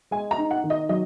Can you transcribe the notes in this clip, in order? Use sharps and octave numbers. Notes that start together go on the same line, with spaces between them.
G#3 G#5
A#5
D#4
F#5
D#3
D#5
F#3 D#5